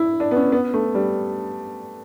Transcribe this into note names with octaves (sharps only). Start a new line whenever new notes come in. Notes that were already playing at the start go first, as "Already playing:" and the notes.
Already playing: E4
D4
B3
C#4
B3
A3
G3